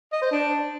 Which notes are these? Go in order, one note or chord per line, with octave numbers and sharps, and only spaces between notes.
D#5
C5
D4